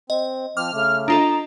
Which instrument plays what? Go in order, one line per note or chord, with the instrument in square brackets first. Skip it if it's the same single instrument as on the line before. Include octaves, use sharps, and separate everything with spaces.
[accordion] C4 [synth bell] D#5
[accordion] F3 C4 [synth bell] D6 [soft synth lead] F6
[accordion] C#3 A3
[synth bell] D4 F4 A4 [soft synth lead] D#5 [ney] A#5